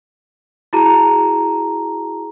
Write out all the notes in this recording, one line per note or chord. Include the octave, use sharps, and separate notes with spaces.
E4 F#4 G#4 A5 A#5